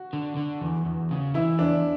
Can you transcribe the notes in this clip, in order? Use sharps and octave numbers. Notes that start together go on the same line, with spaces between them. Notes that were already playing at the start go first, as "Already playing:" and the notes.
Already playing: F#4
D3
D3
E2
E2
C#3
E3 E4
E2 D4